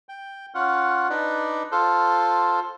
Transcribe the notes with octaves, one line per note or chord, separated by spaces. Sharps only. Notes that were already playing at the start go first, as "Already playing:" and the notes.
G5
C#4 F4 F#5
D4 D#4 B4 D5
F4 A4 C5